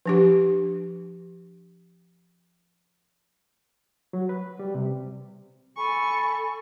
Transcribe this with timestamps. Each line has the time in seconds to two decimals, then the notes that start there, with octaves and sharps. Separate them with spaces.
0.06 F3 D4 G4
4.13 F#3
4.29 B4
4.59 G3
4.75 C3
5.77 A4 G#5 B5 C#6